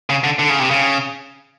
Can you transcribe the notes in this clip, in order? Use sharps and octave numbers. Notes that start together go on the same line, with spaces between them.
C#3
D3
D3
C#3
C3
C#3